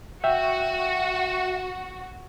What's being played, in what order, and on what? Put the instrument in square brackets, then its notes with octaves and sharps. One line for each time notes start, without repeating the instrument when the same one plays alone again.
[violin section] F#4 [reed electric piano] E5 G5